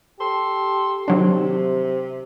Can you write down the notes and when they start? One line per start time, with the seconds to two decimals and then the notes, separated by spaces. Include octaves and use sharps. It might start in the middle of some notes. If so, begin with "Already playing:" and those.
0.18 G4 A4 C6
1.08 C3 D#3 F#3 D4